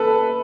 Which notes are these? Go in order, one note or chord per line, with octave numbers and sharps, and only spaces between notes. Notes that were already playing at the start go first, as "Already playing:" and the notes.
Already playing: A4 B4